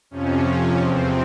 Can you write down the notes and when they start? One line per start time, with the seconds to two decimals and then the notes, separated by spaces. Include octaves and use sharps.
0.11 F2 C3 F3 C#4
0.78 E2 C3 F3 C4